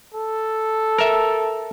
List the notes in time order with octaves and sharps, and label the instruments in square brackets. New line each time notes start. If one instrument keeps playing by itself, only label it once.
[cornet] A4
[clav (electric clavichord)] A#4 E5